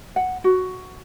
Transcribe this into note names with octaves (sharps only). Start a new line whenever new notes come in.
F#5
F#4